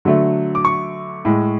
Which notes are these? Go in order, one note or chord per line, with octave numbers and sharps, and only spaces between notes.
D3 F#3 A3
D6
C#6
A2 G#3